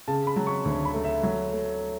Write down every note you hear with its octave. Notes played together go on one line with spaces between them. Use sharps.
C#3 A5
B5
F#3
C#6
D2 C#6
B5
A3
E5
F#3
A3